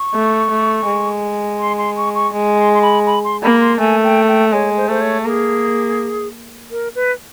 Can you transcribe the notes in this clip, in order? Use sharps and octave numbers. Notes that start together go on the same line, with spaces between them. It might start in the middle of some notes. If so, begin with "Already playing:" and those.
Already playing: C#6
A3
A3
G#3
C6
C6
C#6
C#6
G#3
C6
C6
B5
B5
C6
A#3 B5
C6
A3 G#5
G5
G5
G#3 C#5
C5
A3 C5
C#5
A#3 G#4 A4
A#4
B4